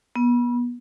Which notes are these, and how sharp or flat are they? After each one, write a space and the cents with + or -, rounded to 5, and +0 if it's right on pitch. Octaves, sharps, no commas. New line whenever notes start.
B3 -30